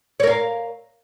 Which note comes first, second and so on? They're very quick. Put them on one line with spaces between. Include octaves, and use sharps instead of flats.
C#5 A#4 F5